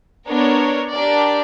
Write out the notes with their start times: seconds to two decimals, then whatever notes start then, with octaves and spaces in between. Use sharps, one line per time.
0.27 B3 D4 A#4 C#5
0.91 D4 G4 A#4 D5